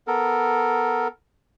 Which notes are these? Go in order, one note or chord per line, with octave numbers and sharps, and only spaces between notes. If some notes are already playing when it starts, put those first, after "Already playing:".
B3 A4 A#4